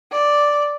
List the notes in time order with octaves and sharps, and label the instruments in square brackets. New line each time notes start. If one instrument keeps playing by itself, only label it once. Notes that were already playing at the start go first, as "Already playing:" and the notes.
[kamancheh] D5